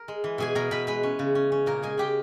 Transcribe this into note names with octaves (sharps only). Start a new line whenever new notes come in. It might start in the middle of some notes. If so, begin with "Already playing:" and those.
Already playing: A#4
G#3
E3
B2 G#4 G#5
B2 A#4 A#5
B2 B4 B5
G#3 B4 B5
C#4
C#3
C#4
C#4
A#2 A#4 A#5
G#3 G#4 G#5
G#3 G4 G5